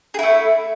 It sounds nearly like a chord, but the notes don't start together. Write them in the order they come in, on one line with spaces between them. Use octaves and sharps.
G#4 E4 A3